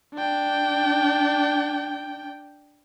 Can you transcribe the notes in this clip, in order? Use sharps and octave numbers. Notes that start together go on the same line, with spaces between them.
D4 G5